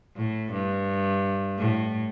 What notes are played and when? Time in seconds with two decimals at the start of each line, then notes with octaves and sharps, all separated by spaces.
0.17 A2
0.53 G2
1.58 A2